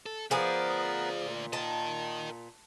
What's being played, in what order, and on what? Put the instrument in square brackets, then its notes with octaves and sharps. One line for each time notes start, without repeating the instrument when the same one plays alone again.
[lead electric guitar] A4
[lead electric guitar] D2 D5 [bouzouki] F3 G#4 [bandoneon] B3 A#4 B4
[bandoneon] A#2
[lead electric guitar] A#4 D#5 [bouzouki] A5